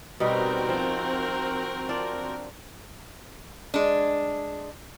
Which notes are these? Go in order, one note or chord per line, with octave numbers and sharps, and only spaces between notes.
B2 G3 C4 D#4 F#4 A#4
F3
D4 F4 D5
G#3 D4